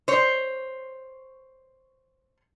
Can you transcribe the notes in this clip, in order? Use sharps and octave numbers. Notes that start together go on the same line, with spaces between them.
C5 C#5